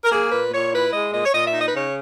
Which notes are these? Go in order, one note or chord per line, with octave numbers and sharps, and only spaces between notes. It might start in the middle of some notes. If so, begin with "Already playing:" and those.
A#4
A#3 G#4
A#2 B4
A#2 C#5
E4 B4
G#3 D#5
A#2 D#5
C#5
A#2 D#5
E5
D#4
D#5
B4
C#3 C#5